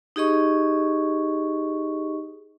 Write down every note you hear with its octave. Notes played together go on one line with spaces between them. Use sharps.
D#4 G4 G#4 D#5 C#6